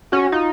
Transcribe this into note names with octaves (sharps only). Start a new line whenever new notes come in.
C#4 F#4
D#4 F4